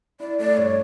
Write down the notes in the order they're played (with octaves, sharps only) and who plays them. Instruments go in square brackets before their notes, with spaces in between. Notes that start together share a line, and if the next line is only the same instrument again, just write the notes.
[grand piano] E4 [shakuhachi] D5
[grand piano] A3 [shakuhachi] D5
[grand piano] G2 [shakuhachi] C#5